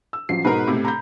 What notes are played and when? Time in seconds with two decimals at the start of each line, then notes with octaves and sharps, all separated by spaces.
0.13 E6
0.29 A1 F3 F#3 C7
0.45 G#2 B2 D#4 A#4 B4
0.67 A2 C3
0.85 A#5 B5 G6